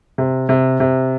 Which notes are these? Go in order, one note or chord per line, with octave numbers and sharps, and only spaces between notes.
C3
C3
C3